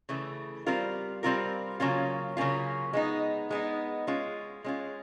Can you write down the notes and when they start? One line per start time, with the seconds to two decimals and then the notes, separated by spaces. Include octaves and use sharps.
0.09 C#3 E3 A3
0.66 G3 C4 F4 A#4
1.23 G3 C4 F4 A#4
1.80 C#3 F#3 A#3 C#4 F4
2.37 C#3 F#3 A#3 C#4 F4
2.93 G#3 B3 D#4
3.50 G#3 B3 D#4
4.07 G#3 C#4 F4
4.64 G#3 C#4 F4